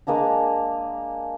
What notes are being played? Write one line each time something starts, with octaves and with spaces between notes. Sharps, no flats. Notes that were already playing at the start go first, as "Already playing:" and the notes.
G#3 A#3 D4 A#5